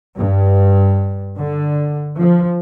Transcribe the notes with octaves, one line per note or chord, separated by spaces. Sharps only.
G2
D3
F3